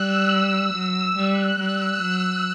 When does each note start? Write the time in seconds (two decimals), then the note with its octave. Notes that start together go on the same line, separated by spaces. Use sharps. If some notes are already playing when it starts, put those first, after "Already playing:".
Already playing: G3 E6 F#6
0.73 F#3
1.16 G3 F#6
1.59 G3 E6
2.02 F#3